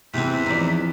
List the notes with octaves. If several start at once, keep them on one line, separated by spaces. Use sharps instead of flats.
E2 C3 C4 F#6 B6
E3 F3 C4 D#4 D5